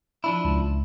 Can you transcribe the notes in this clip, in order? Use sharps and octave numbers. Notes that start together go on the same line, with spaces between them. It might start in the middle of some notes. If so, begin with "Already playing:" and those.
F3 D4 E4
C#2